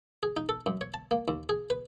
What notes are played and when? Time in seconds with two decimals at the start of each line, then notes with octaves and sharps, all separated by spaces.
0.23 G#4
0.37 D#4
0.49 A4
0.66 F#2
0.81 C#5
0.94 A5
1.11 A#3
1.28 D#2
1.49 G#4
1.70 B4